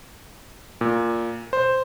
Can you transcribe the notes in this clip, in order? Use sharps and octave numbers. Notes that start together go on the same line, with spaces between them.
A#2
C5